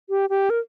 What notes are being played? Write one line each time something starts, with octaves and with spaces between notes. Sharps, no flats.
G4
G4
A#4